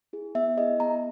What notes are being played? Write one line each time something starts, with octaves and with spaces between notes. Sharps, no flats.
E4 G#4
B3 E5
E4 G#4 D#5
B3 A#5